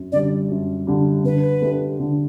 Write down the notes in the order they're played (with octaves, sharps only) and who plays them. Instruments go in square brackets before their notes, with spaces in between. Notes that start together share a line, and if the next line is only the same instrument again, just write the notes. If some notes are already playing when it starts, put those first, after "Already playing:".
Already playing: [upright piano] F#2
[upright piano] D3 G3 [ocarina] D5
[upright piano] F#2
D3 G3
[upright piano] D3 [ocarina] B4
[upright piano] A3 D4 G4
D3